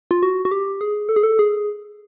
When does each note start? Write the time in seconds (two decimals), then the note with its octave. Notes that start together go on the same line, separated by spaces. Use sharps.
0.11 F4
0.23 F#4
0.45 F#4
0.51 G4
0.81 G#4
1.09 A4
1.16 G#4
1.23 A4
1.39 G#4